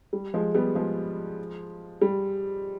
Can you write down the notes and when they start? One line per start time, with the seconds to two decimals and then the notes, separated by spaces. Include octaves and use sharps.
0.13 G3
0.34 F3 G#3
0.55 G3 B3
0.75 F3 G#3
2.02 G3